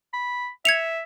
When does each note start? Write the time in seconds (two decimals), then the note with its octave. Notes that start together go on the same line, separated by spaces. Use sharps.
0.14 B5
0.65 E5 G#6 C#7 F7